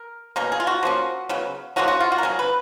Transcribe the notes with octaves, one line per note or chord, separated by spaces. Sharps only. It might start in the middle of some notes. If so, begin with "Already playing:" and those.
Already playing: A#4
B2 A#3 C#4 A#4
G#4
F4
F#4
F3 A#3 C#4
C#3 F#3 B3
C#3 F3 A#3 C#4 F#4
F#4
F4
F#4
A#4
C#3 F#3 C#4 G#4
B4